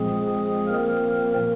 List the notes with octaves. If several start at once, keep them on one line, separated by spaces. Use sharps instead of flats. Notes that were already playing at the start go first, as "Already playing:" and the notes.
Already playing: A#2 F3 G#3 C4 G#4
A#3 A#4